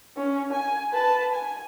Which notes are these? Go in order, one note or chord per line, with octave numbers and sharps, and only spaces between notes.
C#4
G#5
B4 A5
G#5